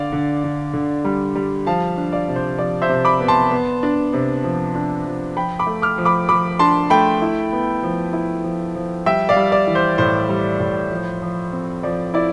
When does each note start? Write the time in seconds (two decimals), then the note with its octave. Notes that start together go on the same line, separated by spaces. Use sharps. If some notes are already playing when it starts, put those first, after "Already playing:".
Already playing: D3 D5 F5
0.12 D3
0.44 D3
0.74 D3
1.05 G3
1.36 G3
1.66 F3 F5 A5
1.97 D4
2.12 D5 F5
2.28 C3
2.36 C5
2.58 F3 D5
2.82 C5 E5
2.89 C3
3.05 B5 D6
3.20 B3
3.28 A5 C6
3.51 B3
3.83 D4
4.13 C3
4.44 F3
4.75 D4
5.05 F3
5.36 F3 G5 B5
5.59 B5 D6
5.67 A3
5.82 D6 F6
5.98 F3
6.05 B5 D6
6.29 F3 B5 D6
6.59 D4 A5 C6
6.90 A3 G5 B5
7.22 E4
7.53 B3
7.83 F3
8.13 E4
8.44 F3
8.75 F3
9.06 G3 E5 G5
9.29 D5 F5
9.36 G3
9.52 D5
9.67 E3
9.75 C5
9.98 A2 C5
10.29 G3
10.60 A2
10.92 F3
11.22 F3
11.53 C4
11.83 F3 D5
12.14 E4 D5